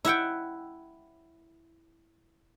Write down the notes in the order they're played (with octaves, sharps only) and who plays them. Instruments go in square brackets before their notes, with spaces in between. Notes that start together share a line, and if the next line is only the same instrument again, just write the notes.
[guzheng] E4 E5 F#5 G5